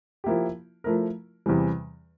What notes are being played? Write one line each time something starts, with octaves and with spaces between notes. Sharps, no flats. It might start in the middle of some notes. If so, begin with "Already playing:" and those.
F3 A#3 E4 G4
F3 A3 E4 A#4
E2 C3 E3 G3